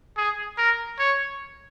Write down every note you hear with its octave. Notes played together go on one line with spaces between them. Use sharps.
G#4
A#4
C#5